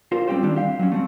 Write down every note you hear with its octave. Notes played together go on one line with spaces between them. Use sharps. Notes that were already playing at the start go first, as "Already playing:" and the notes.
F4 A#4 C5
G3 C4 C#4 G4 C5
D#3 E3 G3 C4 D4
G4 F5
F#3 C#4
A3 C4